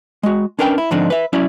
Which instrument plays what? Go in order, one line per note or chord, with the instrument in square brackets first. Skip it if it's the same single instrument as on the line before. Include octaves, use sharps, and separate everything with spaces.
[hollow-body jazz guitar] G#3 F#4
C#4 D4 A#4 B4 F#5 G5
E4
G#2 D3 F3 C4 D4 D#4
B4 E5
F#3 C#4 E4 D5